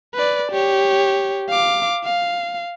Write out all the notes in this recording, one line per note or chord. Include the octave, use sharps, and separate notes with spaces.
B4 D5
G4 C#5
F5 D6
F5